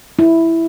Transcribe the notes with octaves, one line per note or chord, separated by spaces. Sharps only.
E4